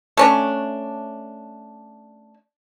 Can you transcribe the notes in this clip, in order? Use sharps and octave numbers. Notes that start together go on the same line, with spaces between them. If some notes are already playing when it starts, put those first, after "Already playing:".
A3 C#4 D4